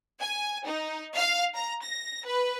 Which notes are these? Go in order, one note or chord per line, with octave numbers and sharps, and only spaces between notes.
G#5
D#4
F5
A#5
A#6
B4